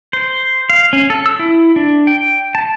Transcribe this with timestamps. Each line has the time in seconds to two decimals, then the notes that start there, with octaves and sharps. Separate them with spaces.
0.13 C5
0.70 F5
0.93 C#4
1.10 A4
1.26 E6
1.39 E4
1.76 D4
2.07 G5
2.55 A5